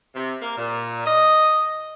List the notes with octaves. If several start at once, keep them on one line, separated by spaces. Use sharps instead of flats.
C3
A#3
A#2
D#5